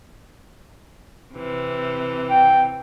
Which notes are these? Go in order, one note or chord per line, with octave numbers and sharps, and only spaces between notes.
C3 E3
G5